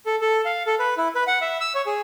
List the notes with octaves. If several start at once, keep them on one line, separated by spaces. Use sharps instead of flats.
A4
A4
F5
A4
B4
E4
B4
F#5
E5
E6
C#5
G#4